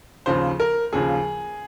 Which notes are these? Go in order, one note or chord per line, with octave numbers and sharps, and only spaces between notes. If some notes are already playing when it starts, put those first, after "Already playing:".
D#2 C#3 F3 C5
A#4
D#2 C#3 F3 G#4